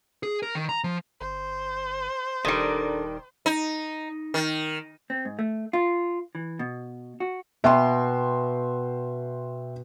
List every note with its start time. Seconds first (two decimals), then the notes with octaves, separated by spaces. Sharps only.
0.23 G#4
0.43 A#4
0.55 D#3
0.69 A#5
0.84 F3
1.21 G1 C5
2.45 D#1 D#3 G3 D4 A4 A#5
3.46 D#4
4.34 D#3
5.10 C4
5.25 G#2
5.39 A3
5.73 F4
6.35 E3
6.59 B2
7.20 F#4
7.64 B2 E5 G5 C6